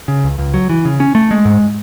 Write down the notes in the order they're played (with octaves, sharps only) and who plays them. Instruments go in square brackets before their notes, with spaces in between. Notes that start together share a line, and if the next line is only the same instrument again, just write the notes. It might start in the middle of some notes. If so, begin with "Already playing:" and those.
[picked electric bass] C#3
C#2
C#2
F#3
E3
C#3
C#4
A3
G#3
G#2